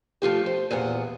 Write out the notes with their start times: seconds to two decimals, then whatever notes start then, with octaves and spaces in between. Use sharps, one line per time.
0.22 F3 A3 F4 G4
0.46 C5
0.71 E2 A#2 B3 F#5